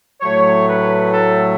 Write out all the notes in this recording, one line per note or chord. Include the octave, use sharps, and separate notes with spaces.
A2 F#3 A3 C#5
B4
A4